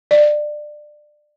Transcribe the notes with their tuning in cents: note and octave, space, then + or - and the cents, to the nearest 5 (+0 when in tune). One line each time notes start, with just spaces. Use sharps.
D5 +20